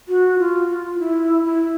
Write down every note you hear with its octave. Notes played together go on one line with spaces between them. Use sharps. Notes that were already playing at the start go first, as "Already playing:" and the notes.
F#4
F4
F4
E4
E4